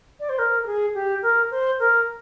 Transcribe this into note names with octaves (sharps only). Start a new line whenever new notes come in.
D5
C5
A#4
A#4
G#4
G4
A#4
C5
A#4